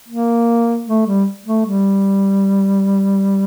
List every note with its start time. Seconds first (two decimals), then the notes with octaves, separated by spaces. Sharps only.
0.08 A#3
0.87 A3
1.06 G3
1.46 A3
1.66 G3